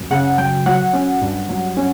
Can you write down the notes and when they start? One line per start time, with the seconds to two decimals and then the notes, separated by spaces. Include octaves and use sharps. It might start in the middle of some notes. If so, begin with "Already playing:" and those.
Already playing: F#2
0.11 C#3 F#5
0.38 F#3 G5
0.66 F#3 F#5
0.93 C#4
1.21 G2
1.49 F#3
1.77 C#4